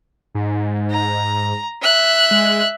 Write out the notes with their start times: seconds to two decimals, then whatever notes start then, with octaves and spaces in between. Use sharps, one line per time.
0.35 G#2
0.90 A#5
1.82 E5 F#6
2.31 G#3